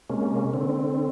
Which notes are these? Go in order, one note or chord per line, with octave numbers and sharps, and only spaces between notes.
C3 G#3 A#3 C#4
D3 C4